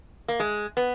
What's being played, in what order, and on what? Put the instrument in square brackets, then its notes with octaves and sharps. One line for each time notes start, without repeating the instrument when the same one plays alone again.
[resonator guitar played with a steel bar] A#3
G#3
B3